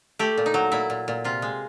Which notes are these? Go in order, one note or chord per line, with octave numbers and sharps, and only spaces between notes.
A3 G4
A#2
D#4
F#3
A#2 E4
A#2
A#2
C3 F4
G#3